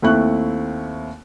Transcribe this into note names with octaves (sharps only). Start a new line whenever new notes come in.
D#2 A3 C4 E4 C#6 F#6